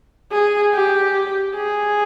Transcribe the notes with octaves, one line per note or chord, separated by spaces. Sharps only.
G#4
G4
G#4